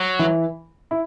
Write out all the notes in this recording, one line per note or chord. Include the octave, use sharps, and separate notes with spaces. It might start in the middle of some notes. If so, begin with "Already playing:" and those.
Already playing: F#3
E3 E4
E4